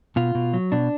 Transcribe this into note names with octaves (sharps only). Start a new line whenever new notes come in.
B2 F4
B2
F#3
B2 D4